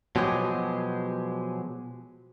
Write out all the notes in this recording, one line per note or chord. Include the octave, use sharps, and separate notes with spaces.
B2 F3 F#3 G#3 G4 G#4